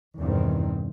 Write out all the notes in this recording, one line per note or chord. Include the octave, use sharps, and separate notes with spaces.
E2 G2 B2 D#3 C4